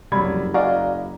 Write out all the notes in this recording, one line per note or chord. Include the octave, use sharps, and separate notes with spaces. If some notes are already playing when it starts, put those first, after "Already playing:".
F#1 C2 F2 F#3 G3 B5 G#6
F#4 D5 D#5 F5 G#5 A#5